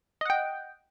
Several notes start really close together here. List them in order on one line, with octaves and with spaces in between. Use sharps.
D#5 F#5 G5